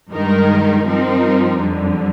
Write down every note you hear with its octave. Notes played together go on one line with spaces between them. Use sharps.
G2 D#3 G#3 D#4 A#4
G2 F3 C4 D#4 A#4
F2 D3 G3